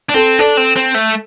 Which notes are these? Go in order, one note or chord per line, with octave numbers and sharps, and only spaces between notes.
D4
C4 A4
D4 A4
C4
C4
A3